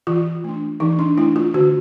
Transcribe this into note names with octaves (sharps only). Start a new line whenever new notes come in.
E3 F4
A3 D4
E3 D#4
D4
A3 D4 E4
F4
D3 F#4